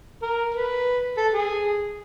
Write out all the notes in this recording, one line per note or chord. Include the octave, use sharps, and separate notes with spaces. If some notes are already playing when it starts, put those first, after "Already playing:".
A#4
B4
A4
G#4